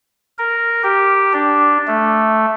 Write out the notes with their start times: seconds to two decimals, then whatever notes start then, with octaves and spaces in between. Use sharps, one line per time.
0.39 A#4
0.83 G4
1.33 D4
1.88 A3